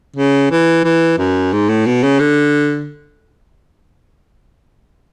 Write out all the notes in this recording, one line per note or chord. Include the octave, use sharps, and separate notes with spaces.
C#3
E3
E3
F#2
G#2
A2
B2
C#3
D3